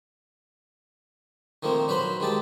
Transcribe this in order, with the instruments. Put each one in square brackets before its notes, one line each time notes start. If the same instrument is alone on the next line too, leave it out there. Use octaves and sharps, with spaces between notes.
[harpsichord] D#3 F3 A3 A#3 C4
F#3 B4 C5 B5 C6
D#3 G#3 G4 A5